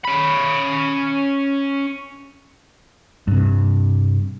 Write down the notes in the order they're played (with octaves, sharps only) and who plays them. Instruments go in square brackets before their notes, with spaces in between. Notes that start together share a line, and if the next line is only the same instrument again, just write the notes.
[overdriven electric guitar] C#4 B5
[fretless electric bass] G2 C3